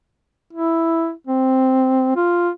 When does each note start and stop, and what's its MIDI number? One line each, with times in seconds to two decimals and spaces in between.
0.53 1.12 64
1.27 2.14 60
2.16 2.50 65